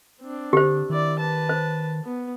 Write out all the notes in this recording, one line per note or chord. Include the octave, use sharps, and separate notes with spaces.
C4 D4
D3 G4 C5
D#3 E4 D5
B4 A5
C5
B3